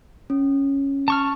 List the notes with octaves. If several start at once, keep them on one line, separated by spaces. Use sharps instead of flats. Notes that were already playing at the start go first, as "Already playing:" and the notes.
C#4
A5 C#6 F6